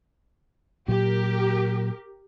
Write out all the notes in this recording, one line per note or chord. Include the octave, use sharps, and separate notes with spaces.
A#2 F#3 G4 A#4